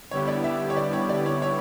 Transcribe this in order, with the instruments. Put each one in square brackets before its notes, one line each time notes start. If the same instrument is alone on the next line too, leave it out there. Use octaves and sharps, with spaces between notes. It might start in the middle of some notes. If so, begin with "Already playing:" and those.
[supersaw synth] D3 G3 B3 E4 G4 [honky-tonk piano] C#5
[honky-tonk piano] D5
E5
C#5
D5
C#5
D5
C#5
C#5